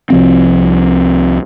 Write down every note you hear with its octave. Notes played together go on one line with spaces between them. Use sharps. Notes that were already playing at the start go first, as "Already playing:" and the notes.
C2 F3 C4